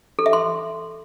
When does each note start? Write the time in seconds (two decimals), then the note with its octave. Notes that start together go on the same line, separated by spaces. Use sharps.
0.19 A4
0.26 E5
0.33 C6